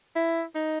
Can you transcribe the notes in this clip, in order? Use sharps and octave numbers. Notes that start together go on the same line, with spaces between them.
E4
D#4